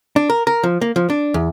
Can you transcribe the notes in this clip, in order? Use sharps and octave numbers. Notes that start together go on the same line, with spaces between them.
D4
A#4
A#4
F3
A#3
F3
D4
E2